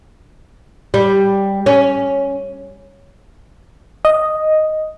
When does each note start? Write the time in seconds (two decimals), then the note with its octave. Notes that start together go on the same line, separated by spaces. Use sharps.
0.94 G3
1.66 C#4
4.05 D#5